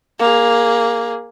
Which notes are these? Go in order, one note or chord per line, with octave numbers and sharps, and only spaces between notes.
A#3 G#4